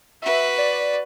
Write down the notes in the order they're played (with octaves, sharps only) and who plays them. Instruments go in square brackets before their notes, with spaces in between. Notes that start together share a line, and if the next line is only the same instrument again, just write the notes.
[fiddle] F#4 B4 [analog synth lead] E5
[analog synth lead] D5